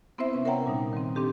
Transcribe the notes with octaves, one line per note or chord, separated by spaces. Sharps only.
B3 C4 E4 C5 E5
C3 C#4 B4 C5
A#4 C#5 E5 F#5 G5 A#5
A#2 G3 D#4
D#3 G3 C4
C4 D4 G4 A4